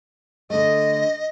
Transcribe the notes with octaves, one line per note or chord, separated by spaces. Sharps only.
D3 A3 D#5